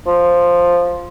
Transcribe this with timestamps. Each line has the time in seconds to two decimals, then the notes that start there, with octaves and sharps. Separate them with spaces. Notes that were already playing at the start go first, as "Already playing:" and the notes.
0.06 F3